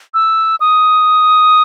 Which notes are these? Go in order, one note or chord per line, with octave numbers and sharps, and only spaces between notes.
E6
D#6